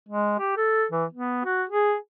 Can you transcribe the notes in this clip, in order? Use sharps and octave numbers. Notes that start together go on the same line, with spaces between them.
G#3
G4
A4
E3
B3
F#4
G#4